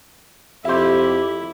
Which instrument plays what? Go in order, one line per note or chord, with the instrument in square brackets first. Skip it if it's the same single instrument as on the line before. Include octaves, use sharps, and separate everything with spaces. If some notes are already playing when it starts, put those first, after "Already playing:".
[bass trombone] F2 [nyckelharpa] E4 [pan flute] G4 [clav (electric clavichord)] C5 E5